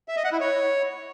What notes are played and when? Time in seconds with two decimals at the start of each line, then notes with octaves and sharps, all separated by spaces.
0.08 E5
0.16 D#5
0.24 F#5
0.32 E4
0.41 C#5